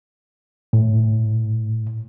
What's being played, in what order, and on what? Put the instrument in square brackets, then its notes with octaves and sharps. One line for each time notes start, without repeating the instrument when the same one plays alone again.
[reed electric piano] A2